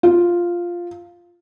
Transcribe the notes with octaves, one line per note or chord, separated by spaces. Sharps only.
F4